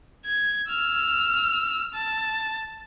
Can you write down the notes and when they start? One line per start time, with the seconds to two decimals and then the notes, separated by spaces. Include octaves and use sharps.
0.26 G#6
0.69 E6 F6
1.94 A5